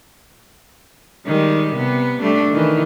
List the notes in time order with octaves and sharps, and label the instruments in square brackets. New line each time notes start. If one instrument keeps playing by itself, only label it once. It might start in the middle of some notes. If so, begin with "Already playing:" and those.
[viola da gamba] D#3 G3 G#3
C3 B3
G3 A3 D4
D#3 E3